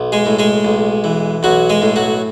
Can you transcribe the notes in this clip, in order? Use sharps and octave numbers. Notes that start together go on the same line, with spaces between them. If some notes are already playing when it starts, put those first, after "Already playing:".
Already playing: B1
G#3 G#4
A2
G#3 G#4
B1
E3
B1 F#3 F#4
G#3 G#4
A2
F#3 F#4